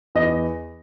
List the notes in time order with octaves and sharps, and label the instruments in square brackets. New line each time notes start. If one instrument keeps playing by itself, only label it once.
[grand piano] E2 D#5